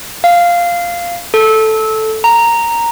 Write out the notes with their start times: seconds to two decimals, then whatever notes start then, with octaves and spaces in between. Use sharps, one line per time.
0.24 F5
1.34 A4
2.24 A#5